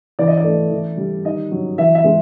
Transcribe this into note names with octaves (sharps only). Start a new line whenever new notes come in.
E3 D5
D#5
D5
A3
E3
G3
D#3 D#5
F#3
E3 E5
E5
G#3